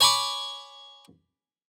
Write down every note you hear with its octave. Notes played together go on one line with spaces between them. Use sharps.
C#5 G#5 B5 C#6 D6